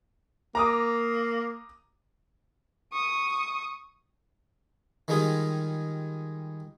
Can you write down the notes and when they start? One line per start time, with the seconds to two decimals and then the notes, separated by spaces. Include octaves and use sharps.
0.55 A#3 A#5 D6 D#6
2.92 C#6 D#6
5.08 D#3 G3 G#3 F4 G#4